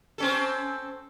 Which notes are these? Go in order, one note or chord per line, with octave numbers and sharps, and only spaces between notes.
C4 C#4 A4